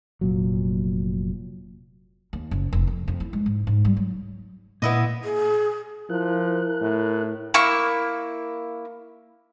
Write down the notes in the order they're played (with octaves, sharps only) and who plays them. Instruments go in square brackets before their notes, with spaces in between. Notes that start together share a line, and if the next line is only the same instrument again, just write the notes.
[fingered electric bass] F1 A#2 F#3
[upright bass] D#2
F#1
F1
F2
F2
E4
G#3
G#2
G#2
G3
F#3
[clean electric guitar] A#2 [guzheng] B3 E4 D#5
[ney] G#4
[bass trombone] F3 [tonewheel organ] E4 A#4 F#6
[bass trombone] A2
[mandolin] A#3 E4 C#6